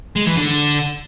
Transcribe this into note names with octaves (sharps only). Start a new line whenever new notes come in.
G#3
E3
D3